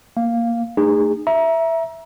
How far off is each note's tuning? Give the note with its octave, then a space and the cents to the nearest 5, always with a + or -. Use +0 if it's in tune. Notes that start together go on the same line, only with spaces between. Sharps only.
A#3 +0 F5 +0
A3 +30 D#4 -30 G#4 -25
E5 +0 A#5 +25